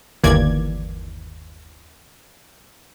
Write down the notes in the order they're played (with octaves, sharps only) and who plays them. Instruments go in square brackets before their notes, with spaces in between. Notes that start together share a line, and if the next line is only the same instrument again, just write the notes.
[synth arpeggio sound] G1 D#2 E3 A#3 D5 G#6